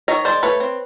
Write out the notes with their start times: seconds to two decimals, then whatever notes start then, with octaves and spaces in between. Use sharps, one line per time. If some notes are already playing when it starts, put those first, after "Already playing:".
0.08 D#3 C#5 D#5
0.25 G#3 C5 D5
0.43 A3 B4 C#5
0.60 C4